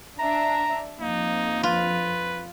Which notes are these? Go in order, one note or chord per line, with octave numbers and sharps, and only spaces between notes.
D4 E5 A#5
F2 A#3 D#4
F4 B4